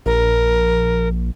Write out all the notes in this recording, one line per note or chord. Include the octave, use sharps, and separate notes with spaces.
A#1 A#4